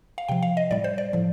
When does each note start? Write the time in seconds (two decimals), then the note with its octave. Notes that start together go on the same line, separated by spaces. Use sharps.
0.18 F5
0.28 C3 F3 G5
0.43 F5
0.57 D#5
0.71 A2 G3 D5
0.84 C5
0.98 D5
1.13 A2 F3